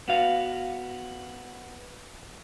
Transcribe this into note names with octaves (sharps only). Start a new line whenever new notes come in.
B3 F#4 F5